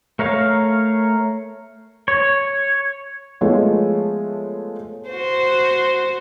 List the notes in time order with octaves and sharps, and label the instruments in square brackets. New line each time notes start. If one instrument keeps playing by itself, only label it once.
[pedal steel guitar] A3 A#4 C#5 F5
C#5
[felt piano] F3 G#3 A3 B3 C#5
[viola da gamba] F#4 C5